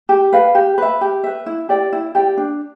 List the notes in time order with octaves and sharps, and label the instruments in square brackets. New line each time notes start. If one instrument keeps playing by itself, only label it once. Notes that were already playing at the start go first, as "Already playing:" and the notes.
[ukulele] G4
B4 F5
G4
B4 E5
G4
B4 E5
E4
G4 D5 G5
E4
G4 D5 G5
D4